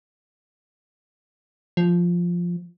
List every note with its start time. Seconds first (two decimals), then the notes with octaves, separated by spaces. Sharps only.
1.77 F3